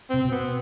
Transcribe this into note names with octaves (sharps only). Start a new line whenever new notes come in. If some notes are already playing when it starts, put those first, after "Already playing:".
C3 C4
B2
B3